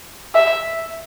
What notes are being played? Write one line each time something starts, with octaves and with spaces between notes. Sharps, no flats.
E5